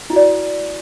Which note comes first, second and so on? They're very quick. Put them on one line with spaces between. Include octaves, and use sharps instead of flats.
E4 F#4 D5